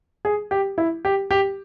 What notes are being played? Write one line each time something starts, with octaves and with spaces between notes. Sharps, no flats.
G#4
G4
E4
G4
G4